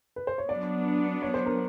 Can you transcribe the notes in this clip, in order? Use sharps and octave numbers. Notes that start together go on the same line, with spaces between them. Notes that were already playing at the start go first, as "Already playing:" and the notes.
B4
C5
C#5
F#3 B3 D4 D5
C#5
C5
A#4